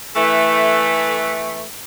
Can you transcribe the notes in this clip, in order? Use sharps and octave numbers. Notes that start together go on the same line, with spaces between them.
E3 A3